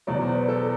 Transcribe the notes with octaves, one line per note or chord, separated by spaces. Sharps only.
E2 B2 F#3 D5
C5
B4
A4